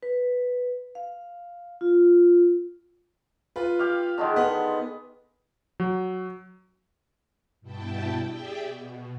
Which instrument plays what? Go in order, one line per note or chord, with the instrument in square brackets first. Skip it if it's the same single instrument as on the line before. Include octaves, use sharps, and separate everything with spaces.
[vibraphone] B4
F5
F4
[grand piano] F4 B4
[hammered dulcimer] G4 F5
D3 D#3 G#3
[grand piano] B3
[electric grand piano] F#3
[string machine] G2 B2 E4 G5 A5
G4 G#4 D5 E5 G5
B2